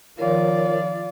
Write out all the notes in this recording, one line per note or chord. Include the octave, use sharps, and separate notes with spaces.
D#3 F3 F4 A#4 C#5 D5